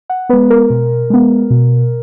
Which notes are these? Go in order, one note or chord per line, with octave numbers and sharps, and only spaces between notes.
F#5
G#3 B3 B4
A#4
B2
G#3 B3
B2